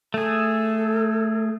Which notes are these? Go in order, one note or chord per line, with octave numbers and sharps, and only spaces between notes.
A3 G#4 A4